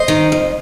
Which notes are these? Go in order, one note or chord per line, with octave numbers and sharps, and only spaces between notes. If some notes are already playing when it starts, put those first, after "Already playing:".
Already playing: C5 D#5
D#3
F2